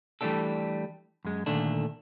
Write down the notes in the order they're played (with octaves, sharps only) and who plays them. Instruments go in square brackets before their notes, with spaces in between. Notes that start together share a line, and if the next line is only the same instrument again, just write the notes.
[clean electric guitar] E3 G3 A3 A#3 D4 A4
F#2 G#3
A#2 D3 D#3 A3 D4